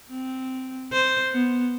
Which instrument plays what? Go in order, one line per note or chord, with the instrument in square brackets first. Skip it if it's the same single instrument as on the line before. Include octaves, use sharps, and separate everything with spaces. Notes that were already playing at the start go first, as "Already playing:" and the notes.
[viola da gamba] C4
C5
B3